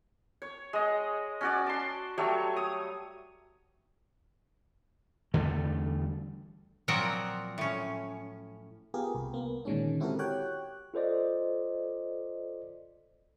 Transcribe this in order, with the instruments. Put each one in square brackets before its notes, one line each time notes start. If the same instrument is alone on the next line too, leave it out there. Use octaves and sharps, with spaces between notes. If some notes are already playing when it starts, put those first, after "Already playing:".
[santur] C#5
G#3 D#5
C#4 F#4 D5
A5 C6
F#3 G3 A3 C#5
D#6
[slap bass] E2 D3 G3 A3
[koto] A#2 F3 F#3 C4 A#4 F#5
A2 C#4
[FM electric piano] B3 F4 G4 G#4 A#4
C2
A#3 B3
A#2 D3 D#3 G#3 C#4 D4
C4 E4 F#4 G4 A4 A#4
F#4 G4 C#5 G5 F#6
[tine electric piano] F4 A4 C5 D5 D#5